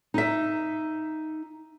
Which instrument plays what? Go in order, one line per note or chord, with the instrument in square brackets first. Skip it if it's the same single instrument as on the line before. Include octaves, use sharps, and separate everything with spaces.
[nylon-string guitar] D#4 E5